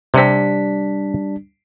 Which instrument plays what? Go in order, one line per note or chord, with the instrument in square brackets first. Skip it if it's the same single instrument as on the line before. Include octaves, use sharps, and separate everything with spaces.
[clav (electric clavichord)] C3 C4 [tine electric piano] G3 D4 B6